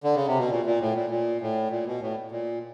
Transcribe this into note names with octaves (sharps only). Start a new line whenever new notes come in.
D3
C#3
C3
B2
A#2
A#2
A2
A#2
A#2
A2
A#2
B2
A2
A#2